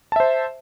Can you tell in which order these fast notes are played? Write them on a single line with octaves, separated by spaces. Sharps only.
A5 E5 C5